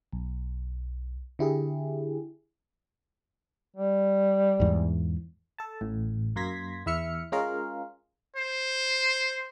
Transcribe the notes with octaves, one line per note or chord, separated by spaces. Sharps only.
B1
D3 E4 G4 G#4
G3
E2 G#2
A4 A5
A1 A2
F#2 A#3 C6 G#6 A#6 B6
E2 E4 E5 F6 C#7
G#3 C#4 F4 G#4 A#4 F5
C5